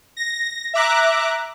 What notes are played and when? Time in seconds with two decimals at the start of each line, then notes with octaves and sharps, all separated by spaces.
0.17 A#6
0.74 E5 A#5 D6 F#6